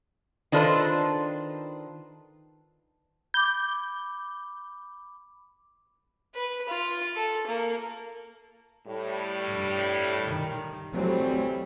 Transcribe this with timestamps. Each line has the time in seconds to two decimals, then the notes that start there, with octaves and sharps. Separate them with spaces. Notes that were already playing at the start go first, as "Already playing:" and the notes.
0.52 D#3 D4 F4 A4 B4 C5
3.34 B5 D6 G6
6.35 B4
6.69 F4
7.16 A4
7.47 A#3
8.88 A2 G3
9.50 G2
10.25 D#3
10.94 E3 F#3 G3 A3 C4